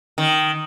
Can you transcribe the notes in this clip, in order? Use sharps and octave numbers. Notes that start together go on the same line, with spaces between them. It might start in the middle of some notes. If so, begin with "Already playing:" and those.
D#3